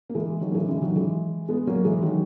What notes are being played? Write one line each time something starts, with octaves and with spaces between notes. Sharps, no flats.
A#3
E3 G#3
D#3 F#3
A#3
E3 G#3
C#3 E3
D#3 F#3
E3 G#3
G#3 B3
F#3 A#3
E3 G#3
D#3 F#3